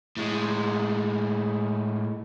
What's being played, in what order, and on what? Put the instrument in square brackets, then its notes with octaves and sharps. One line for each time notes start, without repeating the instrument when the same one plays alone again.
[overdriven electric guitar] A2 G#3